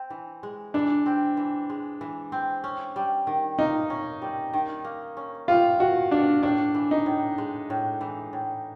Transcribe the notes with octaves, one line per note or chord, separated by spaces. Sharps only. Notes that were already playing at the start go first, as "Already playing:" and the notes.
Already playing: C4
E3
G#3
E3 D4
C4
E3
G#3
E3
C4
C#4
G3
D#3
A#3 D#4
C#4
G3
D#3
A#3
C#4
G3 F4
D#3 F#4
A#3 D4
A2 D4
E3
D#4
A2
G#3
A2
E3
A2